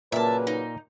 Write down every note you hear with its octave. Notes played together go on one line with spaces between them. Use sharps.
A#2 C#3 F#3 A#3 B4 E5 A5
D#4